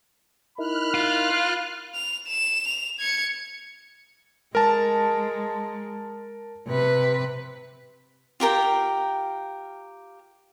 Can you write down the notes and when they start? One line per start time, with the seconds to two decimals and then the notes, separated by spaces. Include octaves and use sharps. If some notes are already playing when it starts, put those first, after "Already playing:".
0.58 D#4 E4 A#4 B5 F6 F#6
0.94 F4
1.95 F7
2.28 E7
2.67 F7
2.99 G#6 C#7
4.55 G#3 A#4 A5
6.67 C3 B4
8.40 F4 G4 A#4 G5